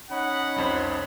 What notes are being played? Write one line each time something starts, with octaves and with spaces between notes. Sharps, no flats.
C#4 D#4 F#5 B5
C2 F2 C5